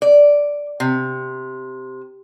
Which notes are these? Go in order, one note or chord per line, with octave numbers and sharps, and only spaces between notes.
D5
C3